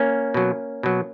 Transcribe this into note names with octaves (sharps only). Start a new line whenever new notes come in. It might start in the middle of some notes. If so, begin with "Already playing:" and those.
Already playing: A#3 C#4
B2 F#3
B2 F#3